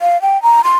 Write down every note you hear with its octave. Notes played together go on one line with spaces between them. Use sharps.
F5
G5
A#5
C6